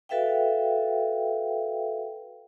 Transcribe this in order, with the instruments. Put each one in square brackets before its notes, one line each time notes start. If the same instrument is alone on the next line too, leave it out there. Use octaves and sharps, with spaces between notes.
[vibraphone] F#4 A4 B4 E5 F5 G5